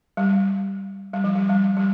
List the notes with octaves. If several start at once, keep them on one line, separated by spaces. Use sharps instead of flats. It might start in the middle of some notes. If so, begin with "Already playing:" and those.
G3
G3
F3
G3
G3
G3